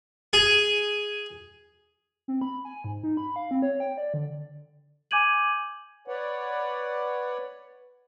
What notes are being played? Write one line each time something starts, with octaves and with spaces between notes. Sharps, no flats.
G#4
C4
B5
G#5
G#2
D#4
B5
F5
C4
C#5
G5
D5
D3
G#5 D6 G6 G#6 D#7 F#7
B4 C#5 D5 F#5